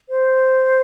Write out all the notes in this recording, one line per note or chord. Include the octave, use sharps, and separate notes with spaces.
C5